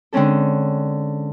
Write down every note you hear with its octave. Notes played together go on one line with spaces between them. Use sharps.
D3 G#3 C4 C#4 A4